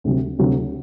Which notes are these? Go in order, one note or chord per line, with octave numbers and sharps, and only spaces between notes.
D2 C3 F#3
D2 C3 F#3